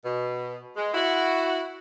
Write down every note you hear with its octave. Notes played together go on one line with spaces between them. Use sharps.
B2
G#3
E4 F#4